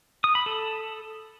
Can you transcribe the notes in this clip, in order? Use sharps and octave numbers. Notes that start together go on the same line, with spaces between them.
D#6
B5
A4